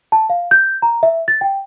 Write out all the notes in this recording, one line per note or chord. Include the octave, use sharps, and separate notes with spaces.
A5
F5
G6
A#5
E5
A6
G5